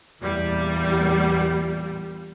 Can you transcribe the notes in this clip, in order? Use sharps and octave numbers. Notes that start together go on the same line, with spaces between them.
E2 A#2 G3